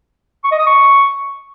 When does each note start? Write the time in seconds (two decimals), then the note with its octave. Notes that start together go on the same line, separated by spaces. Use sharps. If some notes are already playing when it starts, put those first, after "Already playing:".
0.44 C#6
0.52 D#5
0.59 D#6
0.67 C#6